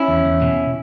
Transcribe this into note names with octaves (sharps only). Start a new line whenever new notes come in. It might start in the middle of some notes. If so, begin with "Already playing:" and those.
Already playing: C#4 E4
E2
E2
B2